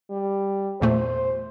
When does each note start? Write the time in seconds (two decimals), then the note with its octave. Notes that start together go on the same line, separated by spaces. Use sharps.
0.10 G3
0.81 E2 A#2 A3 C5